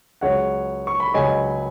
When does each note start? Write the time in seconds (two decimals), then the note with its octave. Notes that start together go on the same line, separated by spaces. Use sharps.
0.21 C#2 C#3 F#3 C#5 F#5
0.87 C#6
1.00 B5
1.14 C#2 C#3 F#3 D#5 G#5